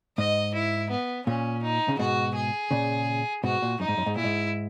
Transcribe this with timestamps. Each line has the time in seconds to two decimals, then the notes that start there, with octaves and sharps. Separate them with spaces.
0.17 G#2 D#5
0.54 E4
0.90 B3
1.26 A#2 C#4
1.62 D#4
1.88 C#3
1.98 G#2 B2 F#4
2.35 G#4
2.71 A#2 C#3
3.43 G#2 B2 F#4
3.62 A#2
3.80 F#2 D#4
3.88 G#2
3.97 F#2
4.06 G#2
4.16 A#2 E4
4.24 G#2